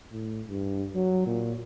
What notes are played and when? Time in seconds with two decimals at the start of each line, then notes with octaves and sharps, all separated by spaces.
0.12 A2
0.48 G2
0.95 F#3
1.27 A#2